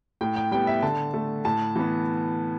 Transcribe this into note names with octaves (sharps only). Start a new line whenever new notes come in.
A2 G5
G5
G3 B3 G5
E5
D3 A5
A3
A2 A5
E3 B3